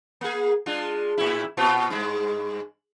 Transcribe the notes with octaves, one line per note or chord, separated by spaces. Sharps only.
A#3 G#4
G#3 D4 F4
A2 E4
A#2 B3 F4
G2 G#3